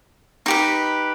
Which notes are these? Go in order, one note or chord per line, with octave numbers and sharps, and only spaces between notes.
D#4 G4 B4